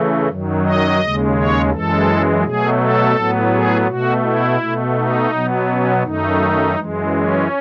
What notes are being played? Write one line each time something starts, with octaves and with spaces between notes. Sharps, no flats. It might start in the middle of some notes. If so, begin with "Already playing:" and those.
Already playing: C#3 E3 A3
F#2 D#3 F#3
D#5
D#2 C#3 G#3
C#5
F#2 E3 G#3 A4
B2 F#3 A3 G#4
A4
A2 F#3 B3
G#4
B2 A3 F#4
E4
B2 A3
D#4
B2 F#3 B3
C#4
F#2 D#3 A3 D#4
F#2 E3 G#3
C#4